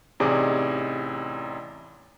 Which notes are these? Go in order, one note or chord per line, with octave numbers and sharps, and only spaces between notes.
A1 C3 D#4 G#4 D5 D6